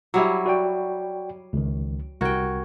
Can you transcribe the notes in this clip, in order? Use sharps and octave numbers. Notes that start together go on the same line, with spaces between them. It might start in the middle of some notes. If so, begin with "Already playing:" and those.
F#3 G3 E4
F#4 D5 G5
C#2 D#3
C2 F#4 A#4 G5 G#6